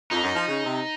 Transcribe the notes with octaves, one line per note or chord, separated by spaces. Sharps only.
F2 D#4
F#2
F3
C#3
C3